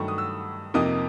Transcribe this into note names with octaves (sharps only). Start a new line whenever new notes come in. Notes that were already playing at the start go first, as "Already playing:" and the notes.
Already playing: G2 D#3 F#3 A3 C#6
D#6
E6
F2 C3 F3 A#3 D#4 D#6